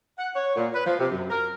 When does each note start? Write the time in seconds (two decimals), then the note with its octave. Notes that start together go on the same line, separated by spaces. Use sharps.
0.19 F#5
0.35 C#5
0.56 A#2
0.74 B4
0.86 F3
0.99 C3
1.11 F#2
1.30 A#4